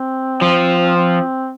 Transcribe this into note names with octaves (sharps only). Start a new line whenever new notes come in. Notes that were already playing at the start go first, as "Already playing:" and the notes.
Already playing: C4
F3
C4